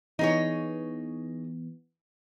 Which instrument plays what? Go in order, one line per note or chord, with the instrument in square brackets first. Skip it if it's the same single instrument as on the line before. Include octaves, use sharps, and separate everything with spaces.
[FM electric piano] E3 B3 [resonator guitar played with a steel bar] D#4 G#4 C#5